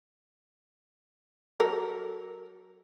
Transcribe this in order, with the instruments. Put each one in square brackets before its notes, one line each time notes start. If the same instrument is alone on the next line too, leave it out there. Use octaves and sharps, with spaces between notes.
[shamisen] F#3 A4 A#4